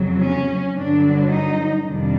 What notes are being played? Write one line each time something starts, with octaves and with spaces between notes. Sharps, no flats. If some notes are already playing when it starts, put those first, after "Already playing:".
Already playing: F2 C#3 F#3
C#4
G2 D3 F#3 D4
D#4
F2 C3 D#3 G3 D4